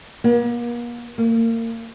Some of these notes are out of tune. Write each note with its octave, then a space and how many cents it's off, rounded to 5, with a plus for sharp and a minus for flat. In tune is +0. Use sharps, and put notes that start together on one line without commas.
A#3 +40
A#3 -30